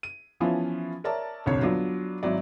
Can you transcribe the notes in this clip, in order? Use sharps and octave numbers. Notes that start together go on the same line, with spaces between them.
D#7
E3 F3 B3 C#4 E4 F4
A#4 C#5 D5 E5 A5 A#5
D#1 C2 F2 D3 C#5
F#3 B3 D4 F4
G#1 F#3 E4 D5